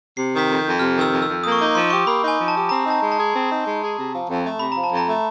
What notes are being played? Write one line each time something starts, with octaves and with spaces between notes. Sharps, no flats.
C3 C7
D#3
B6
F2
G6
F2
C3 F6
D#3
E6
F2
F2 E6
A#3 D#6
C#6
D#4 D6
F3 C6
G4 C#6
A#3 B5
D#4
G#5
F3
A5
G4
C4 A#5
D#4
A5
G#3
A5
G#4
C4
D#4
G#3
G#4
C3
F3
F2
A3
C3 B5
F3 A#5
A5
F2
A#5
A3